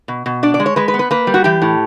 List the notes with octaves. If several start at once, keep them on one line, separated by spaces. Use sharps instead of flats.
B2
B2
D4 D5
D5
G#3
C#5
G#3 B4
B4
B3
B4
A#3 B4
G3
F#4
E3 G4
A2